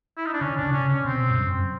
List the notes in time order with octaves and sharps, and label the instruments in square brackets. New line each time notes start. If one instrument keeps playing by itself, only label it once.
[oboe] E4
D#4
D4
[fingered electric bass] D3 [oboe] C#4
[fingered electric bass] C3 [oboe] D4
[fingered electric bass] C#3
[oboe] C#4
[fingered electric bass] C#3
[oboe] C#4
[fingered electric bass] B2 [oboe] C4
[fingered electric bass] G2
F#2